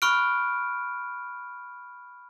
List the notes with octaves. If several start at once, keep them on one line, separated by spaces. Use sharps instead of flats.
B5 C#6 F6 F#6 D7